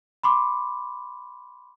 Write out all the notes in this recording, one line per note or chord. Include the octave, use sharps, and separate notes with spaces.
B5 C6 D6